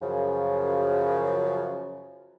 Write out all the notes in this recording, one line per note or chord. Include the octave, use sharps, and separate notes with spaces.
F#2 C#3 F3